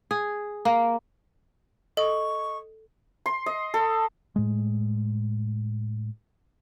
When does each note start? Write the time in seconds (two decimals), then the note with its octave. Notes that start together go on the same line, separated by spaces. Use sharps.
0.11 G#4
0.65 A#3
1.97 A4 D#5 C#6
3.26 C6
3.46 D#5
3.74 A4
4.36 A2 G#3